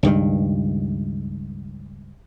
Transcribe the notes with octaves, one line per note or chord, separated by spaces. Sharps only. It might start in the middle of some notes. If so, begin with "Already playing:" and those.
C#2 G2 D#3